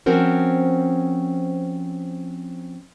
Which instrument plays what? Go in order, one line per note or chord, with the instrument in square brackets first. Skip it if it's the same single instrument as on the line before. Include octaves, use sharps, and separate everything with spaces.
[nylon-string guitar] F3 C4 C#4 F#4 A#4 C5